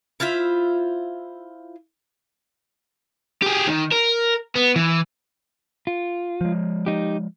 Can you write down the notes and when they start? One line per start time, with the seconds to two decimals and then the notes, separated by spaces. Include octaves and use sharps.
0.20 E4 F4 C5 E5
3.42 G4 G#4
3.67 D#3
3.92 A#4
4.55 B3
4.76 E3
5.87 F4
6.41 F3 G#3
6.86 D#4 G4